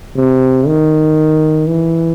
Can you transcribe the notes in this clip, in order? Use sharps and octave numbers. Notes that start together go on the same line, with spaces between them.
C3
D#3
E3